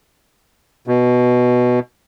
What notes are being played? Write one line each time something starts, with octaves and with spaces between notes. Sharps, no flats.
B2